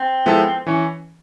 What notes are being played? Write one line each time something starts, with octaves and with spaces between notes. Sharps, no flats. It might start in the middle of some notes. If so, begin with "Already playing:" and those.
Already playing: C4
F3 G#3 B3 E4 A4
E3 C#4